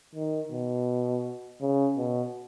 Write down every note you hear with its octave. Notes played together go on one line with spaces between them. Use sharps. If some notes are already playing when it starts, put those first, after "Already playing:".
D#3
B2
C#3
B2